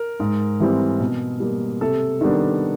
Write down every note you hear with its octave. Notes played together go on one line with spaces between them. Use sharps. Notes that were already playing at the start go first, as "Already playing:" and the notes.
Already playing: A#4
G#2
E3 G3 C4
B2
G3 A#3
C3 A4
D#3 G3 B3 D4